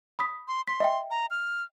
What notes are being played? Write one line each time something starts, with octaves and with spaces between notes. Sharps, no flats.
B5 D#6 B6
C6
C6 B6
D#5 E5 G5
A#5
F6